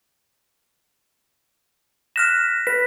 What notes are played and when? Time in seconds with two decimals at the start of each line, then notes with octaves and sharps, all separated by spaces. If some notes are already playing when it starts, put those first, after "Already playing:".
2.16 F6 F#6 A#6 B6 E7
2.67 B4 B6